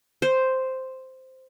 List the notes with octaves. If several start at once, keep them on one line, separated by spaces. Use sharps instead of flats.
C5